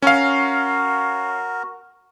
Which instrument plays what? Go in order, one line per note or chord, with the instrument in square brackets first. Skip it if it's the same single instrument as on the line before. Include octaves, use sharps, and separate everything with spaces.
[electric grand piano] C#4 F5 [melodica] F#4 A#4